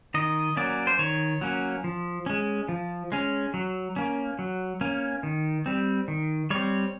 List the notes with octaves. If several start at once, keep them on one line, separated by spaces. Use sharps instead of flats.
D#3 D#5
F#3 A#3 C#4 D5
C5
D#3 C#5
F#3 A#3 C#4
F3
G#3 C#4
F3
G#3 C#4
F#3
A#3 C#4
F#3
A#3 C#4
D#3
G3 C4
D#3
G3 C4 C#5